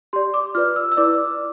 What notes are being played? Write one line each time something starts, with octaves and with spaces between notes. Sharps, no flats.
G4 D5 C6
D6
F4 B4 D5 F6
E6
E6
E4 B4 D5 D6